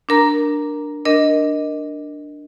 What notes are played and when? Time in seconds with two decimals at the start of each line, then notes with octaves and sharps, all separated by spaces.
0.09 D4 A#4 A#5
1.05 D4 A#4 D#5